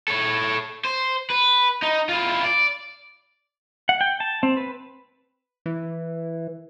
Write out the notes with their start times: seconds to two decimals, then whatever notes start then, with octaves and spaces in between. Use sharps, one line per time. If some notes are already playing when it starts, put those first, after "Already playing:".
0.08 A4 C#5
0.85 C5
1.30 B4
1.82 D#4
2.09 E4 F4
2.44 D5
3.89 F#5
4.01 G5
4.20 A5
4.43 C4
4.57 B4
5.66 E3